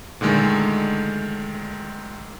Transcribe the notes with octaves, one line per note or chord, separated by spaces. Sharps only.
A#2 D3 D#3 G#3 A3